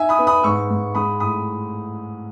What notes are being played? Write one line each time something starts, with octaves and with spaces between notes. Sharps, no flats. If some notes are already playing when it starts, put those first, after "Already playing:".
Already playing: D#4 E5 G#5
B5 D#6
B3
B5 D#6
G#2 C#6 E6
G#2
G#3 B5 D#6
A2 B5 D#6